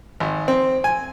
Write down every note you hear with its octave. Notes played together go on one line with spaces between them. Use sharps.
G#1
C4
G#5